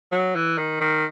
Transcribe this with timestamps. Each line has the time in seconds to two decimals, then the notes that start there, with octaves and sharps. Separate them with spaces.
0.12 F#3
0.35 E3
0.58 D#3
0.80 D#3